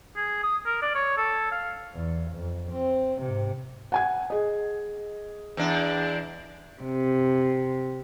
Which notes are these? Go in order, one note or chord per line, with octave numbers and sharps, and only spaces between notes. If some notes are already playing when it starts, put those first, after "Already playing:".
G#4
D#6
A#4
D5
C#5
A4
F5
E2
F2
C4
G#2 C3
F#5 G#5 G#6
G#4 D#5
E2 D4
C3